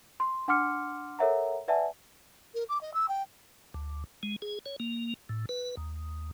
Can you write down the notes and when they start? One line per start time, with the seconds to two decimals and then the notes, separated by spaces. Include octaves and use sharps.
0.20 C6
0.48 D4 F#5 C6 D6 F6 C#7
1.19 A4 A#4 C#5 E5 F#5 A#5
1.68 B4 D5 E5 F#5 G#5 A5
2.54 A#4
2.68 D6
2.81 D#5
2.94 E6
3.08 G5
3.74 D2
4.23 G#3
4.42 G#4
4.66 C#5
4.80 A#3
5.29 A2
5.49 B4
5.77 D#2